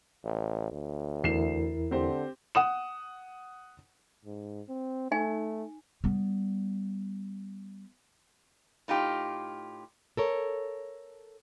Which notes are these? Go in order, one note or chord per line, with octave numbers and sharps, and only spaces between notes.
A1
D2
E2 E4 A#4 C7 E7
D3 C4 G4 C5
F#5 D#6 E7
G#2
C4
A3 D#4 G#5
G3 B3
A2 D#4 F4 G4
A4 A#4 C#5